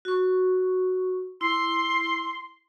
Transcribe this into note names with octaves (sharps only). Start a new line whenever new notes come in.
F#4 C#6
E4 C6